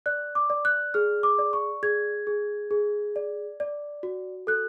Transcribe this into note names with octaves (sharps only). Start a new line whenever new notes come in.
D5 F#6
D6
D5
F#6
G#4 F6
D6
D5
C#6
G#4 G#6
G#4
G#4
D5
D5
F#4
A4 F#6